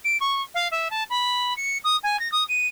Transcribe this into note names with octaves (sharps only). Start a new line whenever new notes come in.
D7
C#6
F5
E5
A5
B5
C#7
D#6
G#5
A#6
D#6
D#7